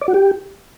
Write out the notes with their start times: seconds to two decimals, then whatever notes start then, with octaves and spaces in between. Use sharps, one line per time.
0.01 D5
0.08 F#4
0.14 G4